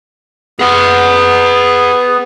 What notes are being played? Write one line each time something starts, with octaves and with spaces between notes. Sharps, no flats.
B3 G#4 F#5